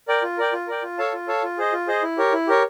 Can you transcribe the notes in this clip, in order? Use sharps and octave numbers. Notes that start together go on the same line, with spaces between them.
A#4 D5 G5
F4
A#4 D5 G5
F4
A#4 D5 G5
F4
A4 C#5 F5 A5
F4
A4 C#5 F5 A5
F4
G#4 C5 D#5
F4
G#4 C5 D#5
E4
G4 A#4 C#5
E4
G4 A#4 C#5